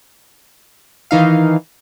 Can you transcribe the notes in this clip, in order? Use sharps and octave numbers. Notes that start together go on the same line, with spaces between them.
D#3 E3 D#4 F5